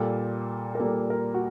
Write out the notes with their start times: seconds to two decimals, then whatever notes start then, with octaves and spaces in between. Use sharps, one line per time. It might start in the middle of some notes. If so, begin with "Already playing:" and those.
Already playing: A#2 G3 A#3 A4
0.75 A#4
0.79 A#2 G3 A#3 A4
1.10 A#4
1.34 F#4